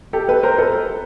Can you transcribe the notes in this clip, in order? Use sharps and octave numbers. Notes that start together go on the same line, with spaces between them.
G4 A4
A4 B4
A#4 C5
A4 B4